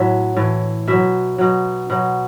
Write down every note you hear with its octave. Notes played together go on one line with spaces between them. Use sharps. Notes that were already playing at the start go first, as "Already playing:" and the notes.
Already playing: A2 F#3 E5
A2 E3
B2 F#3 E5
B2 F#3
B2 F#3